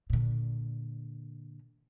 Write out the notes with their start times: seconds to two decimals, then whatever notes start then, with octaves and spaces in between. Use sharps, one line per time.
0.10 A#2 D3